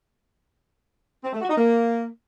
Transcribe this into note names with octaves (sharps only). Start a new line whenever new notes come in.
C4
A3
F#4
D#4
A#3